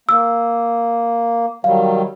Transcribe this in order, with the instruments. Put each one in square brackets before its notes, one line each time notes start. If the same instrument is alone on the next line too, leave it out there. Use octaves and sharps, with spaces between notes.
[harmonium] A#3 [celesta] E6
[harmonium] D#3 F#3 G3 [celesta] F5